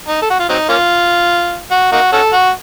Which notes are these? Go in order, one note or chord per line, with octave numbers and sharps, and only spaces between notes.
D#4
A4
F#4
F4
F#3 C4 D#4
A#3 C#4 F4
F#4
A#3 D#4 F#4
C#4 F#4 A4
F#4